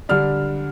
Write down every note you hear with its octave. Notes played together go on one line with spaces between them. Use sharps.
D3 G3 D4 F6